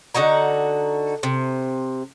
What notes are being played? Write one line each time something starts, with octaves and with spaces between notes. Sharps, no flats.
D3 D#4 F#4 A#5
C3